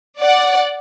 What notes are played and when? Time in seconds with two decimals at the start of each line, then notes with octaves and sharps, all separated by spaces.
0.20 D5 F#5